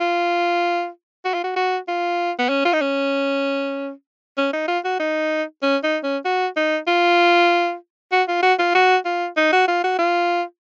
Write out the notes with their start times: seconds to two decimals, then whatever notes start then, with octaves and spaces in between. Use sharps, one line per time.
0.01 F4
1.25 F#4
1.34 F4
1.44 F#4
1.56 F#4
1.88 F4
2.39 B3
2.50 C#4
2.65 F4
2.73 D#4
2.81 C#4
4.38 C#4
4.53 D#4
4.68 F4
4.85 F#4
4.99 D#4
5.63 C#4
5.84 D#4
6.03 C#4
6.25 F#4
6.56 D#4
6.87 F4
8.12 F#4
8.28 F4
8.43 F#4
8.59 F4
8.75 F#4
9.05 F4
9.37 D#4
9.53 F#4
9.68 F4
9.84 F#4
9.99 F4